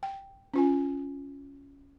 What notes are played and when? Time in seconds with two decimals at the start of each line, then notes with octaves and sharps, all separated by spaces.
0.03 G5
0.54 C#4 F4 G#5